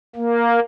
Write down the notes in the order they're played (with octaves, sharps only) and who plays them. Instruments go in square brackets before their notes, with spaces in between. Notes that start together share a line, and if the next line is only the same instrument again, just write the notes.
[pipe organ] A#3